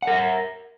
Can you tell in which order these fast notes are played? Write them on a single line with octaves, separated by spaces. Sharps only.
F#5 A#4 E5